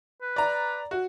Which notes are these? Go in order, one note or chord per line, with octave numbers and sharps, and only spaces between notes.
B4
D5 A#5
F#4